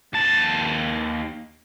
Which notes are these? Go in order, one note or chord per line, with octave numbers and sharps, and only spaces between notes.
D#2 A5